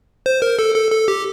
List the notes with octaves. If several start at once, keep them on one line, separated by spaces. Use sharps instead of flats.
C5
A#4
A4
A4
A4
G4